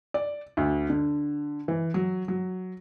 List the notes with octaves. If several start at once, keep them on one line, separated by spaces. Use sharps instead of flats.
D5
D2
D3
E3
F#3
F#3